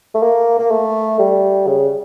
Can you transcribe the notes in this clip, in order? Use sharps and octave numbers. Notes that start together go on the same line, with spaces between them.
A3
A#3
A#3
A3
G3
C#3